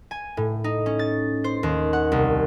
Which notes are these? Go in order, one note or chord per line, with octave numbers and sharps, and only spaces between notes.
G#5
A2
D#4
C#4
A6
C5
D#2
F#5
C2